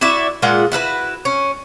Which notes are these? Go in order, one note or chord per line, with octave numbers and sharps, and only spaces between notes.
E4 F#4 D5 E5
A#2 G#3 F4 F#5
E4 F#4 A4 B4
C#4